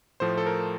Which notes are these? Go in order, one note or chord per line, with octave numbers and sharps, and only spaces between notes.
A2 F3 A3 C5
A4
A#4